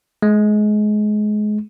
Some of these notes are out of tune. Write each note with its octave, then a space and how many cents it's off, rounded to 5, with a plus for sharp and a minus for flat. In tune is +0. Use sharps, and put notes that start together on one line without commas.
G#3 +25